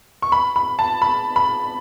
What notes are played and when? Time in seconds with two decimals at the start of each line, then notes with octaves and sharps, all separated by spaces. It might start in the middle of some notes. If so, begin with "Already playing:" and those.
0.22 C#6
0.32 B5
0.56 B5
0.79 A5
1.02 B5
1.36 B5